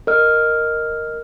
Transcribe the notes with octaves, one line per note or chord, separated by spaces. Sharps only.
A#4 D#5 F6